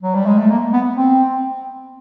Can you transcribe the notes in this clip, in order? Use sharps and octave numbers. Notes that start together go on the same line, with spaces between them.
F#3
G3
G#3
A3
A#3
B3
C4